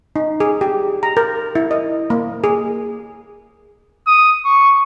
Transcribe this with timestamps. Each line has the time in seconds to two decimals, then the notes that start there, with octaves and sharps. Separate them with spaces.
0.16 D#4
0.40 G#4
0.61 G4
1.03 A#5
1.17 A#4
1.55 E4
1.71 D#5
2.10 A#3
2.44 G#4
4.07 D#6
4.45 C#6